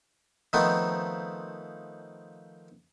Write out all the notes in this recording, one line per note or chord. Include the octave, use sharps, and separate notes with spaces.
D#3 F3 A3 B3 C4 D#4